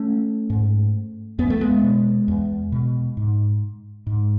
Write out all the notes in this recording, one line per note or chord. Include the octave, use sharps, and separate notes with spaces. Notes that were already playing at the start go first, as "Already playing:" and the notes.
Already playing: A3 C#4
G#2
E2 B3
A3
G#3 B3
B2
E2
B2
G#2
G#2